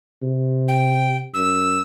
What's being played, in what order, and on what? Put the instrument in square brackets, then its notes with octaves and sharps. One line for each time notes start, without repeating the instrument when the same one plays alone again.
[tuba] C3
[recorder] G5
[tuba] F#2 [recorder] E6